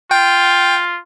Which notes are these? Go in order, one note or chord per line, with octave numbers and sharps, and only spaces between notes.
F4 G5